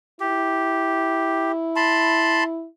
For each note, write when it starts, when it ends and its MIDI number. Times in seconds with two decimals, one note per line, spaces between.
0.20 2.67 64
0.20 1.52 67
1.76 2.44 81
1.76 2.44 83
1.76 2.44 84